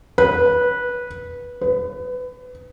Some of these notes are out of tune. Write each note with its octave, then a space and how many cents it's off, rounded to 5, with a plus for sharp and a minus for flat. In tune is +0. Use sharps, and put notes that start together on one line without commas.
B4 -15
B4 +25